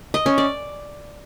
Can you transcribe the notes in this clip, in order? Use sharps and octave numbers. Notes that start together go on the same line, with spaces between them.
D#5
C#4
D5